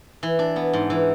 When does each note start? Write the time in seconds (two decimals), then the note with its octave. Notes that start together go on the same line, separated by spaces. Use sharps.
0.23 E3
0.39 D4
0.56 B3
0.73 G#2
0.90 E3